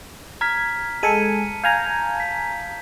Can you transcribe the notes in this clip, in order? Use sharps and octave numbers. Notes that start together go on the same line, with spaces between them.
A#5 F6 G#6 B6
G#3 A4 G#5 A5 C#7 D#7
F5 G#5 A#5 G6 G#6 F7
A5 B6